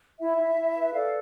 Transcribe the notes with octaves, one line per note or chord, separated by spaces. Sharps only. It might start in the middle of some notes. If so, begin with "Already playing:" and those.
E4 E5
E4
E4
B4
A4 D5 F5